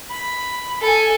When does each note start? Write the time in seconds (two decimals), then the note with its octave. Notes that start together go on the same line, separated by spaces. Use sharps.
0.11 B5
0.81 A4 G#5